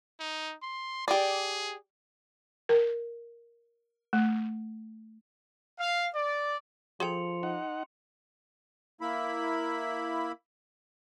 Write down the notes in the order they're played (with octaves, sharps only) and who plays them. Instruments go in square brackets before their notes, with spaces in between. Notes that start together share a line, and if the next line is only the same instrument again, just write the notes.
[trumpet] D#4
C6
[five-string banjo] G4 D5 [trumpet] G#4
[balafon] A#4
A3
[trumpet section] F5
D5
[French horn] F3 [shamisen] G#4 A4 G5 [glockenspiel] C6 C#7 F7
[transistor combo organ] D#4 F#5
[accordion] A#3 E4 B5